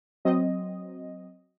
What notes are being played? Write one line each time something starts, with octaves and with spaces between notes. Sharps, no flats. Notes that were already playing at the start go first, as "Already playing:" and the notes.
F#3 C4 D#5